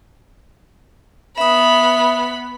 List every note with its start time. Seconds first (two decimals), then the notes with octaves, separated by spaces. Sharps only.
1.38 B3 E5 B5 D#6